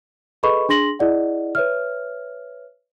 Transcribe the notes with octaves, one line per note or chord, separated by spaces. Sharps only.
G#4 A4 B4 D#5 B5 C#6
D4 G#4 C6 A#6 F#7
E4 G#4 D5 D#5 F#5
B4 C#5 E5 F6